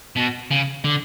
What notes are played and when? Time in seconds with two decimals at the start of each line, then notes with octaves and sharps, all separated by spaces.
0.17 B2
0.51 C#3
0.84 D3